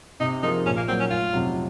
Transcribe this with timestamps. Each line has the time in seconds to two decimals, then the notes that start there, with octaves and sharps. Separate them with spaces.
0.20 C3 D#4
0.43 F3 A#3 D#4 F4 G#4
0.65 A#1 C#4
0.76 A#3
0.88 A#2 F#3 A#3 C4
1.00 C#4
1.10 F1 F4
1.33 F2 C3 F#3